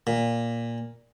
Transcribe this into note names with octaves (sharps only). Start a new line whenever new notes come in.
A#2